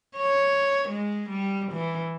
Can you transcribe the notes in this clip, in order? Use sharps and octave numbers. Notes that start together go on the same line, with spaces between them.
C#5
G#3
G3
E3